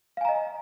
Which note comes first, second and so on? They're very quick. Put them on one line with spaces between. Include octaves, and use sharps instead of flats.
F5 G#5 A#5 D#5